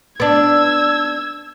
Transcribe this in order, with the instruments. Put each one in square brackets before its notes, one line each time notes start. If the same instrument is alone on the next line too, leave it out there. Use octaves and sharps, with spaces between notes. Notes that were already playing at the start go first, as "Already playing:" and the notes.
[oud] B3 D4 [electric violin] E6 G#6